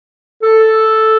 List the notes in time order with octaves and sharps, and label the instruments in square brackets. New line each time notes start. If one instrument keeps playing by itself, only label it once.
[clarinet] A4